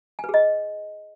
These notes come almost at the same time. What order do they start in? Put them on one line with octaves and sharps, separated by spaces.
G#5 B4 G#4 D#5